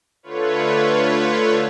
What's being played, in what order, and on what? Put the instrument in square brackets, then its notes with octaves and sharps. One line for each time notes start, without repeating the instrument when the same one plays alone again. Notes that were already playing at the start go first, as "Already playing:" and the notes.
[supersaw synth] D3 A3 F4 B4 C#5